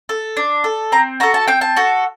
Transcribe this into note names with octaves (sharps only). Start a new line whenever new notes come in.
A4
D4
A4
C4 A#5
F#4 A4 A#5
A5
C4 G5
A5
F#4 A4